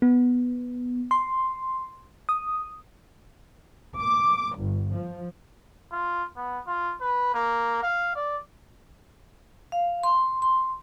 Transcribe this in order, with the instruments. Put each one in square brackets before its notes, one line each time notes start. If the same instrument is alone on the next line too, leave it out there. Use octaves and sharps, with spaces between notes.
[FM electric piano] B3
C6
D#6
[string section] D6
G1
F3
[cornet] F4
B3
F4
B4
A#3
F5
D5
[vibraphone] F5
C6
C6